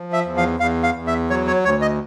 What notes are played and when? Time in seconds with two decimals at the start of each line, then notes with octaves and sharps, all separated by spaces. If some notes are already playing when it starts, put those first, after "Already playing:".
Already playing: F3
0.13 E5
0.25 E2
0.37 F5
0.60 E2 F5
0.83 F5
0.95 E2
1.07 E5
1.30 F#3 C#5
1.47 C#5
1.65 D2 C#5
1.82 D#5